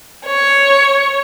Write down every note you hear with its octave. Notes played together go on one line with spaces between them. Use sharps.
C#5